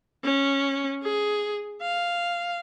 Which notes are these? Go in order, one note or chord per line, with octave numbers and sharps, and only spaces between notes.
C#4
G#4
F5